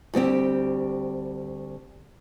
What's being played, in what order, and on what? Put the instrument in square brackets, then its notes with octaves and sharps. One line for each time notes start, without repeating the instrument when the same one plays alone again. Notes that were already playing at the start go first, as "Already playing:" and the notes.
[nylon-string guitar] D2 G3 C4 G4